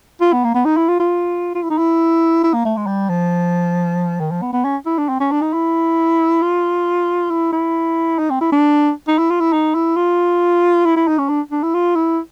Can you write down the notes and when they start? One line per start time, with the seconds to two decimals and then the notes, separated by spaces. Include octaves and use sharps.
0.21 F4
0.33 B3
0.44 A#3
0.54 B3
0.65 D#4
0.76 E4
0.88 F4
0.99 F4
1.55 F4
1.62 E4
1.70 D#4
1.78 E4
2.43 E4
2.54 A#3
2.65 A3
2.77 G#3
2.86 G3
3.09 F3
4.20 D#3
4.31 F3
4.42 B3
4.53 B3
4.64 C#4
4.86 E4
4.98 D4
5.09 C4
5.20 C#4
5.31 D4
5.42 D#4
5.53 E4
6.42 F4
7.30 E4
7.52 E4
8.19 D#4
8.30 C4
8.41 E4
8.52 D4
9.08 D#4
9.18 E4
9.30 F4
9.40 E4
9.52 D#4
9.74 E4
9.96 F4
10.85 E4
10.96 E4
11.07 D#4
11.18 C#4
11.29 D4
11.51 D4
11.63 E4
11.74 F4
11.95 E4